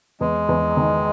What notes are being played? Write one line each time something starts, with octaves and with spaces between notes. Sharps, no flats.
E2 G#3
E2
D#3